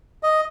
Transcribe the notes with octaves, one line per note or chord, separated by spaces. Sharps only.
D#5